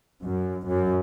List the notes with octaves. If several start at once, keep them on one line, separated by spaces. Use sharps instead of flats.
F#2
F#2